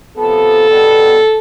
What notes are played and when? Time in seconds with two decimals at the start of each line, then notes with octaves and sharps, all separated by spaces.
0.17 C3 F3 B3 A4
0.68 B2 G3 B3